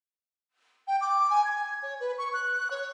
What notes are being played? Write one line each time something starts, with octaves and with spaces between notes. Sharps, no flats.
G5
D6
G#5
G#6
C#5
B4
C#6
F#6
C#5